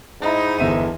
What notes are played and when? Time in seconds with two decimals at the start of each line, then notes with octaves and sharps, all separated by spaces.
0.21 G#2 D#4 E4
0.58 G1 E2 E5 D#7